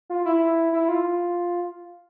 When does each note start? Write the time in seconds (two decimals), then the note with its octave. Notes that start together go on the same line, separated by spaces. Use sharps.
0.10 F4
0.26 E4
0.72 E4
0.88 F4